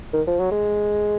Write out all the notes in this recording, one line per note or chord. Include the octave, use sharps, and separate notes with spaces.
D#3
F3
F#3
G#3